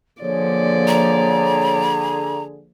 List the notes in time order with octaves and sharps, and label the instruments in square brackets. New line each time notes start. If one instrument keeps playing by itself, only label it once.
[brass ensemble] D3 G#4 [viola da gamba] F3 A#3 D5 [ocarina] C#5
[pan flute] A#5